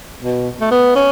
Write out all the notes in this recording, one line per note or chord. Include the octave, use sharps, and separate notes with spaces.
B2
A3
B3
C#4